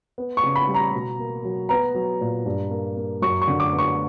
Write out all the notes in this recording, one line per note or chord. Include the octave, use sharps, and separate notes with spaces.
B3
C#6
C#3
B5
G3
A#5
B2
A#3
F#3
B3 A#5
F#3
A#2
G2
A#3
A#3
F#2 C#6
C#6
D3
D6
B3
C#6